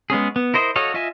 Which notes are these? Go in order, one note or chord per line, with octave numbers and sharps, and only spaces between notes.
G#3 B3 C#4 G#4
B3
E4 A#4 C5 D#5
F#4 A4 C#5 D#5 F5
F4 D#5 E5 G#5